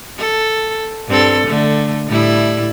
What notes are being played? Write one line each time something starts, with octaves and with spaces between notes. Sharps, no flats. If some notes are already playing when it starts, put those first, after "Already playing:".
A4
G2 C4 A4
D3 A3
A2 G3 E4